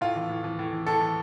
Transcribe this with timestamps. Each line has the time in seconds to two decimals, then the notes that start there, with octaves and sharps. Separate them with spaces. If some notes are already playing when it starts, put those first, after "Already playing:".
0.01 A2 F4
0.16 E3
0.29 A2
0.44 E3
0.59 A2
0.73 E3
0.87 A2 A4
1.01 E3